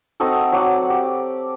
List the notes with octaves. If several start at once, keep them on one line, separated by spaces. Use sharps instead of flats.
C4 D#4 F#4 A4
F#3 D5 F#5
G4